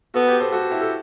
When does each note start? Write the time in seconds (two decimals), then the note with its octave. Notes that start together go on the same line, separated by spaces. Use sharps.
0.14 B3 F#4 A4
0.27 G4 B4
0.40 A4 C5
0.52 F#4 A4
0.71 E4 G4
0.81 A4